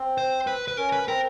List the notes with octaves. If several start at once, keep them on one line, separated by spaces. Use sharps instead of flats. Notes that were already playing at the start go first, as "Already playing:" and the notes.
Already playing: C4
C5
B4
B4
C#4 A#4
B4
C4 A#4